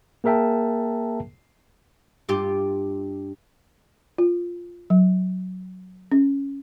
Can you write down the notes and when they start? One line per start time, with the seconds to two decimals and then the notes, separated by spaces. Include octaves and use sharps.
0.24 A#3 G#4 A#4 E5 G5 A5
2.29 G2 F4 G4
4.18 F4
4.90 F#3
6.12 C#4